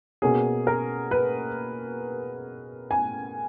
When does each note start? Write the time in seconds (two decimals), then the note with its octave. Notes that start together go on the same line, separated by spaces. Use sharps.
0.22 B2 A#3 C#4 G#4
0.67 A#4
1.11 B4
2.91 G#5